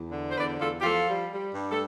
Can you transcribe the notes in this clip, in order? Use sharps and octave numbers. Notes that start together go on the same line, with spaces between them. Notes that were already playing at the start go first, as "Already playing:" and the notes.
Already playing: E2
D3
C5
E2 B4 D5
E2 F4 A4
G4
F3 F4 A4
G3
G3
G2
A4